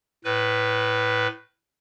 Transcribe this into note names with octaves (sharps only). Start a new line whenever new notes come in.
A2 B4